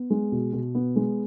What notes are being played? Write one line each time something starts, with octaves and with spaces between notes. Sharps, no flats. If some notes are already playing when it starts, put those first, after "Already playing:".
Already playing: B3
G#3
B2
B2
B3
G#3